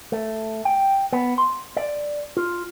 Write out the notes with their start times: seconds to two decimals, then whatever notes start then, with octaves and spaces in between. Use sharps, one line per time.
0.12 A3
0.65 G5
1.13 B3
1.38 C6
1.77 D5
2.37 F4